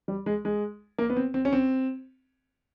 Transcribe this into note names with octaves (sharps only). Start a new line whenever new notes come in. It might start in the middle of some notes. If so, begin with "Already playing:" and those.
G3
G#3
G#3
A#3
B3
C4
C4
C#4
C4